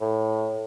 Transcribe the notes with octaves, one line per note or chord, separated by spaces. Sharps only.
A2